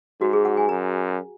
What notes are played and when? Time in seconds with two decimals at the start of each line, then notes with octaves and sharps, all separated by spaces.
0.21 G#2 F#4
0.33 G#4
0.45 F#5
0.57 G#5
0.69 F#2 A#5